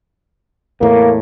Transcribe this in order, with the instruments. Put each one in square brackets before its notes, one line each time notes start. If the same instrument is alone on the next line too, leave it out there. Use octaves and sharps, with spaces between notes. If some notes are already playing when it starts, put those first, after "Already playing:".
[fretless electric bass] E2 A2 [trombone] A#3